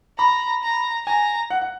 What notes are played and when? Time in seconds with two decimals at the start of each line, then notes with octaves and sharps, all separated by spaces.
0.18 A#5 B5
0.63 A#5
1.06 G#5 A#5
1.50 F#5
1.62 F#5